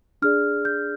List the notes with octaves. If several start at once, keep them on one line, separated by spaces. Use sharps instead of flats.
D4 G#4 D5 F6
G6